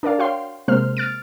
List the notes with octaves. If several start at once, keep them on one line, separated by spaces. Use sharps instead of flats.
D4 A#4 D5 F5
F#4 C#5 F5 G5 C6
C3 G#3 A#3 C5 F6
F6 A6 D7